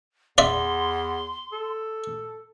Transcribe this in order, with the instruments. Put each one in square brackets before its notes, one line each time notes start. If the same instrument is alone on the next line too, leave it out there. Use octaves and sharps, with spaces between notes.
[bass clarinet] E2 [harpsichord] D5 E5 [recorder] C6
[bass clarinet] A4